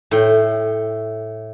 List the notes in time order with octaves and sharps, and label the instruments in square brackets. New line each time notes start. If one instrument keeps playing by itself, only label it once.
[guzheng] A2 G5